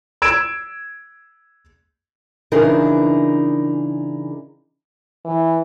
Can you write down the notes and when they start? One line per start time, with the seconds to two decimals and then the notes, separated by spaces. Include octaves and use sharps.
0.22 E6 G#6 D7 E7
2.52 C#3 E3 D4 D#4 G#4 A#4
5.25 E3